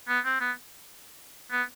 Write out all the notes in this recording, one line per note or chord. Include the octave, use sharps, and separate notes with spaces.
B3
C4
B3
B3